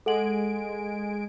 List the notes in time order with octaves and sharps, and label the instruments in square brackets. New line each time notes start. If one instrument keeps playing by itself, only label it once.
[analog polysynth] G#3 G#5 D7 [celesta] A4 F#5 F#7